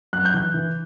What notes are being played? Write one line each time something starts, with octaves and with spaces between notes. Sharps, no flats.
F#2 F#6
G6
E3 F#6
E3